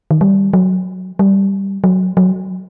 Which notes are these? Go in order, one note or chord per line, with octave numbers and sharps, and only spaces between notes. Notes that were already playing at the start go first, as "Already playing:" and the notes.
D#3
G3
F#3
G3
F#3
F#3